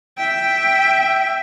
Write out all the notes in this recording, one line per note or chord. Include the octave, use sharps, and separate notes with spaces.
E5 G5